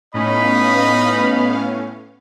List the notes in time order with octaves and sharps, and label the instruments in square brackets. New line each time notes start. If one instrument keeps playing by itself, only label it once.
[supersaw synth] A2 C#4 [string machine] B3 F5 [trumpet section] D#4 D#5 B5